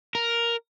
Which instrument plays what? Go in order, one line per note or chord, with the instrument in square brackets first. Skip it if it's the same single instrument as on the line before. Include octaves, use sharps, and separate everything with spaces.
[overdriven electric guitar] A#4